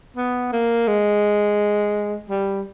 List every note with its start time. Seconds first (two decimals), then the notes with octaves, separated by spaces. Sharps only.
0.16 B3
0.52 A#3
0.88 G#3
2.30 G3